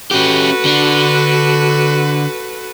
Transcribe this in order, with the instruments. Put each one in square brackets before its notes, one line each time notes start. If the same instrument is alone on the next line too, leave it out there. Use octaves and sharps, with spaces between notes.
[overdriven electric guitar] C#4 G4 [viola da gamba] F#4 A4 B4
[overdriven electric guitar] D3 D4